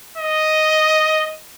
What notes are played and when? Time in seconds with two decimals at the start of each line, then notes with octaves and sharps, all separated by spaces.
0.17 D#5